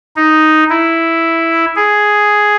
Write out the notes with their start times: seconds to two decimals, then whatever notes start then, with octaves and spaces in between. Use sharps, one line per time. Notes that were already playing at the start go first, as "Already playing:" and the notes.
0.16 D#4
0.70 E4
1.76 G#4